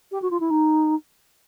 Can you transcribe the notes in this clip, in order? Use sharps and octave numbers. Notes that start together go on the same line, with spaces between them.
G4
F#4
F4
E4
D#4